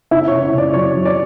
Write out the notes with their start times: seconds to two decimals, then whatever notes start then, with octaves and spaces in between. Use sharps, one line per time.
0.11 C#3 E4 E5
0.28 C#5
0.32 C#3
0.43 C#5
0.54 C#3 D5
0.74 F#3 C#5
0.95 F#3
1.05 D5